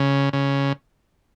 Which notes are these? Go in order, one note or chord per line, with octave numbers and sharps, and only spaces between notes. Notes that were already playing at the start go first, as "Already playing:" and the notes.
Already playing: C#3
C#3